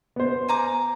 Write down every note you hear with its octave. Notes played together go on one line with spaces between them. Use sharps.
B3 C5
G#5 A#5 D6